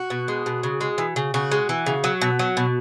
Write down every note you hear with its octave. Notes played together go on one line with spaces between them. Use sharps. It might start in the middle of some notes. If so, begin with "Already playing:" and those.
Already playing: F#4
B2
G#3
B2
C#3
G#3
E3
C#3
C#3 F#4
G#3
E3
C#3
F#3
B2
F#3
B2